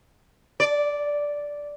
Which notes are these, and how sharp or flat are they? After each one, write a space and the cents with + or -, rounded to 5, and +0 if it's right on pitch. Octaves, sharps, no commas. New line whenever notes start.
D5 -5